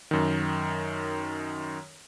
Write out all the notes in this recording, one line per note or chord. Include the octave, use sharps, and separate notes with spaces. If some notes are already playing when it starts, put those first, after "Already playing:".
F#2 D#3